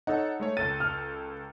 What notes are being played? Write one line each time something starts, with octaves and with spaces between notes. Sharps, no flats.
D#4 A4 C#5 F#5
G#3 A3 C#5
C#2 A4 A6 D#7
F6